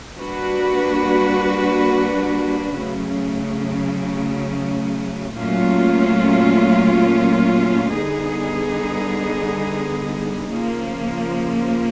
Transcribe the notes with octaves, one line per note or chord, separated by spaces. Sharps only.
G3 A#3 D4 F#4 B4
C#3 F#3 A3
A#2 F#3 A3 C#4 F4
D3 G3 B3 D#4 G#4
C#3 F3 A#3